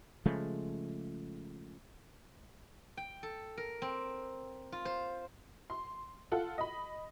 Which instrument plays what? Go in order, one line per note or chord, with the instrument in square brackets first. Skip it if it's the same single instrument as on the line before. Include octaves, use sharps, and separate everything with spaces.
[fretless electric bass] C#3 F3 G#3 A3
[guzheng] G5
A4
A#4
C4
F4
C5
[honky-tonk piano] C6
F4 A4 F#5
D#5 B5